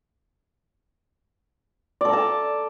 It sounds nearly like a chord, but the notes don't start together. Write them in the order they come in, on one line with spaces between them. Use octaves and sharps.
D5 A4 A#5 A5